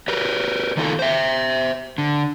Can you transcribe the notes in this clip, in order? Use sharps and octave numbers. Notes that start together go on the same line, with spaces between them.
G4 A#4 B4
D#3 D#4 F4 F#4 A4 A#4
C5 E5
D3